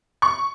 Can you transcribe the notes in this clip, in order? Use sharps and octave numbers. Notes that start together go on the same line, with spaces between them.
C#6